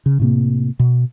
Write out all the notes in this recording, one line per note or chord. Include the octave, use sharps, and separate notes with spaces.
C#3
A2 C3 A#3
B2